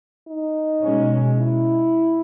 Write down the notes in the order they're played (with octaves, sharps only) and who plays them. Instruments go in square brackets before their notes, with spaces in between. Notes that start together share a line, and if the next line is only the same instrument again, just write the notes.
[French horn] D#4
[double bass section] B2 G#3 C#4
[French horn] E4